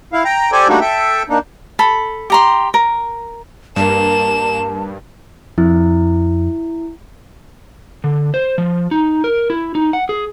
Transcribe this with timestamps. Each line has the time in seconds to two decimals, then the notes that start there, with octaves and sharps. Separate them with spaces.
0.13 E4 F5
0.25 G5 A#5
0.52 G4 A4 C5 D5 G#5
0.68 G3 A3 A#3 D4 D#4 F#4
0.81 A4 E5 G5
1.29 A#3 D4 D#4
1.79 A4 B5
2.30 G4 A#5 C6
2.74 A#4
3.76 G2 A#3 A5 E7
5.58 F2 E4
8.04 D3
8.34 C5
8.58 F3
8.91 D#4
9.24 A#4
9.50 E4
9.75 D#4
9.93 F#5
10.09 G#4